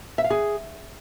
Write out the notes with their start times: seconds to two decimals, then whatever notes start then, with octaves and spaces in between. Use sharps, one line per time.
0.18 E5
0.24 F5
0.30 G#4